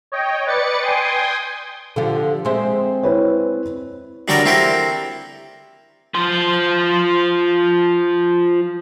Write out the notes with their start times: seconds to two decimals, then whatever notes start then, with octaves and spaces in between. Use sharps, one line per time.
0.12 C#5 D#5 G5
0.46 B4 D5 A6 C#7
0.81 G5 G#5 C6 D#6
1.96 D3 F3 G4
2.45 G#3 C4 E5
3.03 E4 B4 C#5
4.28 D3 F#3 G3 F#4 A#4 D5
4.46 C4 E4 G4 A4 A#4
6.15 F3 C5